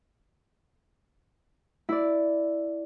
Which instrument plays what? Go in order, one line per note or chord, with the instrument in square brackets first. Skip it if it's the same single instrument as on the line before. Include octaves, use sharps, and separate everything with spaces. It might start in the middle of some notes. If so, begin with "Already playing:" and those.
[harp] E4 D5